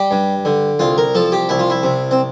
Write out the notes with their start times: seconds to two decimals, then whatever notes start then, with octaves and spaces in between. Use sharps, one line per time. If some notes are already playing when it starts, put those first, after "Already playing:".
Already playing: G3 G4
0.11 G2
0.45 D3
0.79 C2 F4
0.98 A#4
1.15 F3 A4
1.32 G4
1.49 C2 E4
1.59 F4
1.70 E4
1.83 C3
2.11 C4